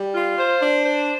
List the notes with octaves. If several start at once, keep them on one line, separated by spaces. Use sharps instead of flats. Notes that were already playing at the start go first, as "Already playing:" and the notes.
Already playing: G3
F4
C5
D4
C5